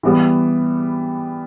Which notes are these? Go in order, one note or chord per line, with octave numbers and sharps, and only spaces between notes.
E3 G3 B3